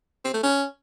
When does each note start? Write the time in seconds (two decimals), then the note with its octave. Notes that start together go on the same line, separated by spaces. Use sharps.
0.24 C4
0.34 A3
0.43 C#4